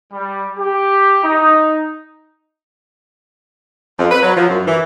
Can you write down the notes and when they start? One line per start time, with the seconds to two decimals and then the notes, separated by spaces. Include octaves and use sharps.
0.13 G3
0.59 G4
1.24 D#4
3.99 F2
4.11 B4
4.23 F#3
4.36 F3
4.49 F#2
4.67 E3